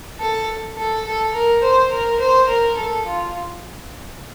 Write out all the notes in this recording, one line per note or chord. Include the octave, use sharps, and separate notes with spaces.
A4
A4
A4
A#4
C5
A#4
C5
A#4
A4
F4